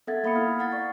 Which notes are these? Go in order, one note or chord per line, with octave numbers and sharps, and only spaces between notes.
B3 A4 E5 F#5 G#6 A6
A#3 F5 B5 D#6 C#7
E4 F6
E4
F5 F#5 A6
D5 F#5 C#6